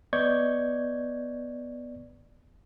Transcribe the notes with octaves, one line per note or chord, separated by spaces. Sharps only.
B3 D5 D#5 C#6 G6 G#6